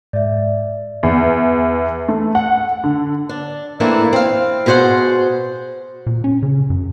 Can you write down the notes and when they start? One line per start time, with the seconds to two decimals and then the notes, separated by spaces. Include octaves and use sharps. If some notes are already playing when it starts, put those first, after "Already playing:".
0.13 G#2 D5 E5
1.03 E2
2.08 A3
2.35 F#5
2.84 D3
3.29 D4
3.80 E3 A3 A#3 C4 D4 E4
4.13 C4 F5
4.66 B2 G#4 C5 C#5 F#5
6.07 A#2
6.24 C#4
6.43 C#3
6.70 F#2